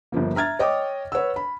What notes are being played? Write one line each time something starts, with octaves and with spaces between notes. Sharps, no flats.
G1 G2 F3 A#3
E5 A#5 F6 G#6 A6
C#5 D#5 G5 D6 D#6
B4 C#5 F#5 E6
B5